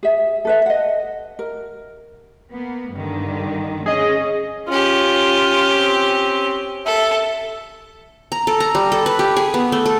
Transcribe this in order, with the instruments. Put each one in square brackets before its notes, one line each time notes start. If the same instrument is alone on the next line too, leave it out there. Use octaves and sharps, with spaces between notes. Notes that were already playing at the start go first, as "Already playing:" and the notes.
[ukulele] G#4 E5
A4 B4 E5
D#5 F#5
A#4
[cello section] A#3 B3
G2 D3 D#3
[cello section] C#4 [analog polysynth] G#4 D#5
[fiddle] C#4 G4 [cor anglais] F4
[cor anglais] C4
[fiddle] A4 [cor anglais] E5
[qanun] A#5
A4
A#5
G3
A4
B4
G4
G#4
B3
A3
A4